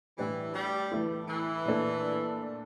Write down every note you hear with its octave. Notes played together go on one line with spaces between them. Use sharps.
A2 E3 G3 D4 G4
G3
E3 A3 E4
E3
A#2 A3 D4 A4